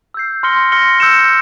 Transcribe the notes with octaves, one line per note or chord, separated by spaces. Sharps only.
E6 G6 C7
C6 F6 A#6 C#7 G7
C6 F6 A#6 C#7 G7
E6 G6 C#7 E7